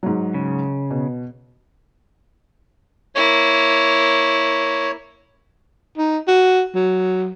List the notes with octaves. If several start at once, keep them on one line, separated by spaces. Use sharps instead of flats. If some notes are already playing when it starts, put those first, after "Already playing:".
G#2 F#3
C#3
B2
A#3 E4 C#5
D#4
F#4
F#3